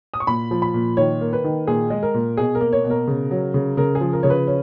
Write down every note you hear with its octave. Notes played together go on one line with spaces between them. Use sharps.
D#6
C#6
A#2 B5
F3
B5
A#2
D#3 C#5
A#3
B4
D#3
A#2 G#4
G#3
A#4
A#2
B2 G#4
A#4
A#3
C#5
B2
A#4
C#3
F#3
C#3
C#3 A#4
G#4
F3
A#4
C#3 C#5
B4
C#4